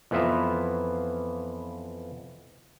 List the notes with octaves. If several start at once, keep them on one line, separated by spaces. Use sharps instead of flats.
F2 E3 B3 F4 E5 A#5